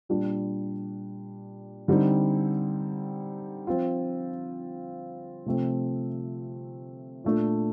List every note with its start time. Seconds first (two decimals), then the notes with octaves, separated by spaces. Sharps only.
0.09 A#2 G3 D4
1.88 D3 G3 C4 D#4
3.67 F3 C4 F4
5.46 C3 F3 A3 C4
7.24 A#2 A3 D4